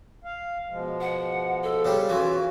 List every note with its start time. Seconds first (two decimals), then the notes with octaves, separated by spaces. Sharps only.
0.24 F5
0.69 B2 F3 G#3
1.01 F#5
1.63 A4
1.85 C#3 G3
2.09 E3 C#4 F4 F#4